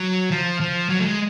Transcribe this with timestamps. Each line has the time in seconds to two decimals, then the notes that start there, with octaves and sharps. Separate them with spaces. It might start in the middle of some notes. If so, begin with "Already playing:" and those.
Already playing: F#3
0.31 F3
0.60 F3
0.89 F#3
1.00 A3
1.05 G#3